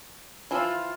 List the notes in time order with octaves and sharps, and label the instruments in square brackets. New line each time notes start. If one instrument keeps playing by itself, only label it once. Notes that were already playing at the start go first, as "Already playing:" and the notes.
[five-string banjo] E3 F3 E4 [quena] F4